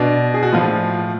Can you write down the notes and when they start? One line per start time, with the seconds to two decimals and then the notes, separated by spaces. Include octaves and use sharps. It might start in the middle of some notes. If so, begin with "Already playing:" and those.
Already playing: B2 D4
0.34 G#4
0.43 F#4
0.53 A2 F3 F4